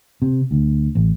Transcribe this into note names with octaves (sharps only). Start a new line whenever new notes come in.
C3
D2
A1